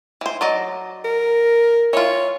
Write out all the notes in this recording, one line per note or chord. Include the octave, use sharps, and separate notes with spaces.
E3 C5
F#3 D5 D#5
A#4
E3 F4 C#5